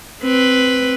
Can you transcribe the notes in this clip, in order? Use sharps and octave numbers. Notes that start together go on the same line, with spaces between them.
C4 B4